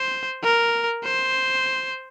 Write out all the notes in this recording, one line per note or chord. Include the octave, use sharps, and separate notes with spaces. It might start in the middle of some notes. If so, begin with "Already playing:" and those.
Already playing: C5
A#4
C5